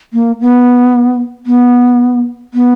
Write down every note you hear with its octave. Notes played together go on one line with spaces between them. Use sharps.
A#3
B3
B3
B3